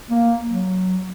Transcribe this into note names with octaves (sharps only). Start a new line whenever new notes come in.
A#3
F#3